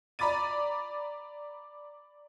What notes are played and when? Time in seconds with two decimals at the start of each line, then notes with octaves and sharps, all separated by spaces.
0.19 D5 A#5 B5 D6 A6 D#7